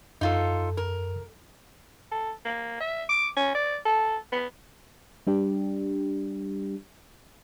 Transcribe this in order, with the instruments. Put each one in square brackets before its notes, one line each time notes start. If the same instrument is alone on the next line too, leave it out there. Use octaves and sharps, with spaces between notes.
[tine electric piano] F#2 [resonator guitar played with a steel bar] D#4 F4 A4
[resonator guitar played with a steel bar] A#4
[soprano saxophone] A4
A#3
E5
D6
C#4
D5
A4
B3
[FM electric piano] G3 D4 G4